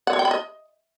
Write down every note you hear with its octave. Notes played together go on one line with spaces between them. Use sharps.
F#5
C#5
G5
B5
D#5